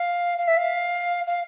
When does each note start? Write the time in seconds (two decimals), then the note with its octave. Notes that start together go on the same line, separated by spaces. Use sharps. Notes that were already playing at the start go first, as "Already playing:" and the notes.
Already playing: F5
0.38 F5
0.47 E5
0.56 F5
1.26 F5